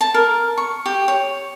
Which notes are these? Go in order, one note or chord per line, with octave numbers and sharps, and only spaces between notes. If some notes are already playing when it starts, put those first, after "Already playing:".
A5
A#4
C#6
G4
C#5